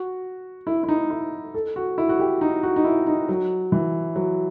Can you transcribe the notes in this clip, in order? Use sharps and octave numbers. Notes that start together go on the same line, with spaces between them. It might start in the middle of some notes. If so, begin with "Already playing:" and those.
Already playing: F#4
E4
E4
D#4
E4
A4
F#4
E4
F#4
G4
D#4
F#4
D#4
E4
D#4
F#3
E3
F#3